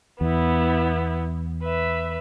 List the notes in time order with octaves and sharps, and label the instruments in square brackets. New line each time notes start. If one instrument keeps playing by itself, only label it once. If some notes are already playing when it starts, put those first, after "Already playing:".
[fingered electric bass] E2 [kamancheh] B3 E4
[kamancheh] B4 E5